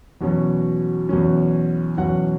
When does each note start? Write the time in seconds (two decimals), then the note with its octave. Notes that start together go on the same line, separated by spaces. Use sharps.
0.21 E2 B2 F#3 C#4
1.09 E2 B2 F#3 C#4
1.97 E2 B2 F#3 C#4 F#5